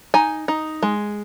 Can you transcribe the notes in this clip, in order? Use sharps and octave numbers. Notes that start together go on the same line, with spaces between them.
D#4 G#5
D#4
G#3